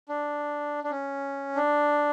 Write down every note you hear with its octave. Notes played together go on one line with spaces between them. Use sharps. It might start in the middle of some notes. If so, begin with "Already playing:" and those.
D4
D4
C#4
D4